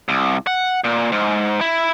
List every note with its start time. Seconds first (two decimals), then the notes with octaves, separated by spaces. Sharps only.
0.09 C2
0.47 F#5
0.84 A#2
1.12 G#2
1.61 E4